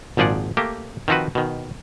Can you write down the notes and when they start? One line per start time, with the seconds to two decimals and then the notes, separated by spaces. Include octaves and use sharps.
0.17 G#1 A#2 F3 G#4 D5 F#5
0.57 A3 A#3 G4
1.08 D#3 F3 C4 F#4 B4
1.35 B2 D#3